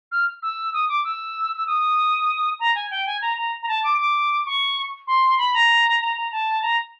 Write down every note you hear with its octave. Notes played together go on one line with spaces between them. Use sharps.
F6
E6
D#6
D6
E6
E6
D#6
A#5
G#5
G5
G#5
A#5
A#5
A#5
A5
D6
D6
C#6
C6
B5
A#5
A#5
A#5
A5
A#5